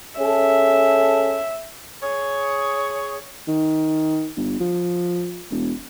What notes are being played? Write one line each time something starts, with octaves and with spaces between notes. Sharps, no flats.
C#4 G#4 A4 E5
G#4 C#5
D#3
G1
F3
E1